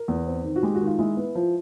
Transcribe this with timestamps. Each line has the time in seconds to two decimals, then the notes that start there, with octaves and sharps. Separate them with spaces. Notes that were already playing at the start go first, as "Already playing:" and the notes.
Already playing: A#4
0.08 E2
0.26 C4
0.44 D#3
0.56 F#4
0.63 G#3 G4
0.75 F#4
0.81 D#3
0.87 F4
0.99 G#3 E4
1.17 B3
1.35 F3